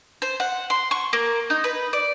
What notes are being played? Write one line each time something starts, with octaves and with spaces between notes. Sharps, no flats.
C5
F#5
C6
C#6
A#3
D#4
B4
D5